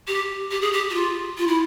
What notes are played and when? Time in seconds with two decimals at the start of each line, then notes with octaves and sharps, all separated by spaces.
0.08 G4
0.51 G4
0.61 G#4
0.73 G4
0.90 F#4
0.94 F4
1.38 F4
1.47 E4